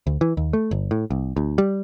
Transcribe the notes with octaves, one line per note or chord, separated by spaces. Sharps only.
D2
E3
D#2
A3
G1
A2
C2
D2
G3